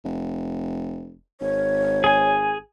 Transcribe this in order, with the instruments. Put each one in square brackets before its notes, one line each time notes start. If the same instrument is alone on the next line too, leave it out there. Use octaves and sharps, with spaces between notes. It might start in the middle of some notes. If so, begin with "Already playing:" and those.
[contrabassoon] F1
[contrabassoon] G#1 [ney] C#5
[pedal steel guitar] G#4 G#5